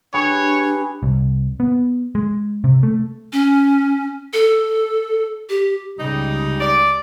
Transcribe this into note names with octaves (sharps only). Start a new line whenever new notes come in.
D4 G4 G#4 B4 C#5
C2
B3
G#3
C3
A3
C#4
A4
G4
C#2 C#3 G3 D#4
D5